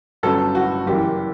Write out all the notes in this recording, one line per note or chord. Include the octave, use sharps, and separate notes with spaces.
G1 G2 F#3 C#4 A4
F#4
F#1 F#2 E3 G4